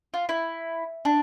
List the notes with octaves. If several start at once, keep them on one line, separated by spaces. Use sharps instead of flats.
F4
E4
D4